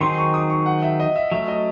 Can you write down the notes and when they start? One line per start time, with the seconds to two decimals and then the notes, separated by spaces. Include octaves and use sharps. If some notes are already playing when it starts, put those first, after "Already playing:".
0.01 D#3 F#3 C4 D#4 G#4 C6
0.18 C#6
0.34 D#6
0.50 C#6
0.66 F#5
0.82 E5
1.00 D#5
1.16 E5
1.32 F#3 A3 C#4 E5
1.48 D#5